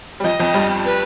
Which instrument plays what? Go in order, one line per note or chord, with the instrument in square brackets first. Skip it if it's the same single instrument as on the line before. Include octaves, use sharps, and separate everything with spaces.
[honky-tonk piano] G3
[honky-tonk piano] F2 F3 [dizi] D#5
[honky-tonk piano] F2 F3
G2 G3
[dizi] B4